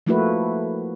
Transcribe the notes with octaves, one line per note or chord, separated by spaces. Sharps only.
F3 A3 A#3 E4 F#4 B4